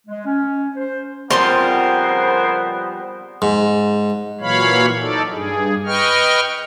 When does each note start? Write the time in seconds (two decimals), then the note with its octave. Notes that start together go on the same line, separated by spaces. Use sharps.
0.07 G#3
0.26 C#4
0.76 C5
1.31 C#3 F3 G3 B3 C4 A#4 C5 C6
3.42 G#2
4.41 A#2 E3 F#3 C#5 F5 B5
5.01 D#4 A4 D5
5.32 G2 G#4
5.86 B4 D#5 G5 C#6 F6